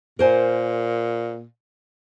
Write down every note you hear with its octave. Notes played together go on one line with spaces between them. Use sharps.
A#2 A#4 C5 G#5